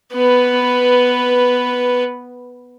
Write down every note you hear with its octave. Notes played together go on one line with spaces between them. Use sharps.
B3 B4